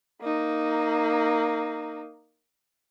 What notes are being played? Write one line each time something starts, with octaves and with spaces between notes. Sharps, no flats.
A#3 D#4